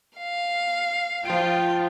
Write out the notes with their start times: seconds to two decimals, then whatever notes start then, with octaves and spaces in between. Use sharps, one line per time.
0.18 F5
1.25 F3 F4 G5 D7